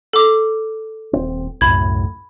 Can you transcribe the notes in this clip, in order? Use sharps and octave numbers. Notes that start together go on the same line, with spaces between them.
A4 D6
D#1 C4
C2 F#2 A2 B5 G#6